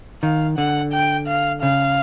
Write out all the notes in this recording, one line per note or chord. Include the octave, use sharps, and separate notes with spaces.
D#3 F5
D3 F#5
G5
F5
C#3 F5